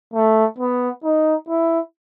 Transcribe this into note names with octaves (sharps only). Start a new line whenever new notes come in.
A3
B3
D#4
E4